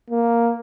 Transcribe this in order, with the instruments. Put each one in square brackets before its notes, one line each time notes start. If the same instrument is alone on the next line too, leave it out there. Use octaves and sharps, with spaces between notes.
[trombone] A#3